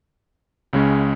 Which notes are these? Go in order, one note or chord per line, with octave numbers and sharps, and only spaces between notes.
C#2 C#3 G#3 C#4